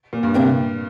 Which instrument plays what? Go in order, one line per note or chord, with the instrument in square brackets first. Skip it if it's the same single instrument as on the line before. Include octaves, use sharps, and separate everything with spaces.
[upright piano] A#2
G2
[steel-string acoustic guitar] D2 C3 A#3 D4 [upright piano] G2